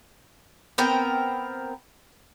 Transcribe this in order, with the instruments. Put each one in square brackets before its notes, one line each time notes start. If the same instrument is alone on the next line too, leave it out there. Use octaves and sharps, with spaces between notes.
[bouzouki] B3 C4 A#4 G5